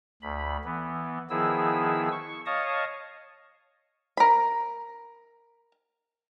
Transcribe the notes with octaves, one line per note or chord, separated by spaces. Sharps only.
D2 B5
E3 B3
D#3 F3 B3 E4 G#4 E6
C#6
C#5 D#5 F5 A5 C#6 D#6
A#4 B5